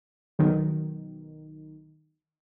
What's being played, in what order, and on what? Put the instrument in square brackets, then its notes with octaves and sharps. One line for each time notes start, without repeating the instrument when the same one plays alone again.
[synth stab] B1 D#3